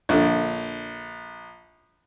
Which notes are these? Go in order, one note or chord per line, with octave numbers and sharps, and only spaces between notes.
A#1 D3